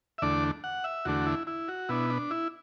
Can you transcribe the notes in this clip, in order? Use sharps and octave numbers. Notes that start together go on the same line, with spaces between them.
E5
E2 D3 A3 D4 D5
F#5
E5
E2 D3 A3 D4 F#4
E4
E4
F#4
B2 B3 D4 E4
D4
E4